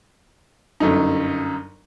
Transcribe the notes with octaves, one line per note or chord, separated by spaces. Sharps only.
G1 F#2 D#4